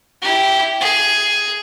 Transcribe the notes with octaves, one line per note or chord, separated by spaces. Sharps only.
E4 G4
G#4